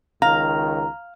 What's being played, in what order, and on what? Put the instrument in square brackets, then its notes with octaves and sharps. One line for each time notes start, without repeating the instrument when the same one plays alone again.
[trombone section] C#2 D#3 [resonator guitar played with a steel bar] F5 [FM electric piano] A#5